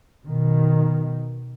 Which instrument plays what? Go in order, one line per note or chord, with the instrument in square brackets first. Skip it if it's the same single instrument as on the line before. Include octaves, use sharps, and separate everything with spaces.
[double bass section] B2 D#3